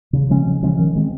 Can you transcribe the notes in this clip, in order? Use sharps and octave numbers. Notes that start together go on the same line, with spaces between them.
C#3
F3 G#3 C#4
C#3
F3 G#3 C#4
D#3
G#3 C4